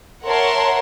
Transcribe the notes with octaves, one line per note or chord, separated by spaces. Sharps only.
A#4 C#5 E5 F#5 A5 C6